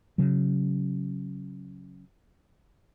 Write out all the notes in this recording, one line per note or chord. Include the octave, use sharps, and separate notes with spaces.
C#3 F#3